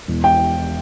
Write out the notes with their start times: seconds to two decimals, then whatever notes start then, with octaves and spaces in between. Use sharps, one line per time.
0.08 E1
0.24 G5